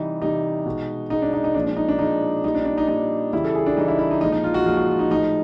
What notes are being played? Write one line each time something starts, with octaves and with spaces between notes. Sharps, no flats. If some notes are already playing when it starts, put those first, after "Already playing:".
Already playing: C3 E3 G3 D#4
C3 E3 G3 D#4
B2 G#3
B2 G#3 D#4
D4
D#4
D#4
A#2 F3 G#3 D4
D4
D#4
D4
A#2 F3 G#3 D#4
A#2 G3 D#4
D4
D4
D#4
A#2 G3 D#4
C#3 E3 G3 E4
A4
G#4
D4
C#3 E3 G3 D#4
E4
E4
D#4
A#2 F3 G#3 D#4
D#4
F4
F#4
A#2 F3 G#3 F4
F#4
F4
D#4
A2 F3 G#3 D#4